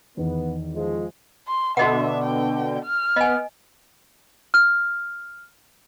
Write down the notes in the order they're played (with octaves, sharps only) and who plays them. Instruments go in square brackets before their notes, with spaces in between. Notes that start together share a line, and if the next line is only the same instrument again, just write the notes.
[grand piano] E2 D#3 [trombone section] B3
[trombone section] F3 G#3
[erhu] C6
[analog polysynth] B2 D3 [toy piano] F#4 D#5 F#5 [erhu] E5
[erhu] G5
F6
[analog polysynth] B3 [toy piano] D#5 G#5
[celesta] F6